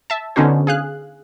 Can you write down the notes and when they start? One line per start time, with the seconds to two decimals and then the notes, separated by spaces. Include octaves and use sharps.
0.10 E5 A5
0.36 D3 B3 C#4 D#4 F#4 C5
0.67 G#4 F5 F#6